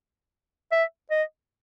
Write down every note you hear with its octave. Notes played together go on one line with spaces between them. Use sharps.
E5
D#5